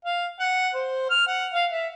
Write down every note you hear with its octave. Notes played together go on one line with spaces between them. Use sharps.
F5
F#5
C5
F6
F#5
F5
E5